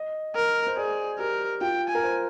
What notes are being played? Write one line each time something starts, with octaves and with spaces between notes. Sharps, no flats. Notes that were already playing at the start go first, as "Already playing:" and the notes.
Already playing: D#5
A#4
C5
G#4 D5
G4 A#4
F4 G5
G#5
A#4
C5